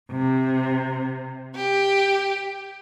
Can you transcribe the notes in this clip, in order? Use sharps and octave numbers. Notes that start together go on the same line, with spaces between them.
C3
G4